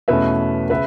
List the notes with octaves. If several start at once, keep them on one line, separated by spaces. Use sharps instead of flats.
E2 B2 A3 C#4 B4 E5
C#3 B4 E5